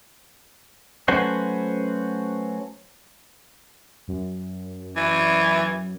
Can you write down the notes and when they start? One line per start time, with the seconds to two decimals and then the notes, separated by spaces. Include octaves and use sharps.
1.08 F#3 A3 C#4 F#4 B4 C5
4.08 F#2
4.96 E3